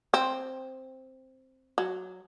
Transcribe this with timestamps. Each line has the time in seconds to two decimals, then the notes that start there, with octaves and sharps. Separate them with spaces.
0.14 C4
1.78 F#3